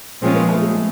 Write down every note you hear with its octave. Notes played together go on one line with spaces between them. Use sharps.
A#2 F3 G#3 C4 C#4 F4
B3
A3
G#3